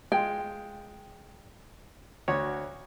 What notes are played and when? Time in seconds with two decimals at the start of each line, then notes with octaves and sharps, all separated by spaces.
0.12 G#3 F4 G5
2.28 D2 F#4 C#5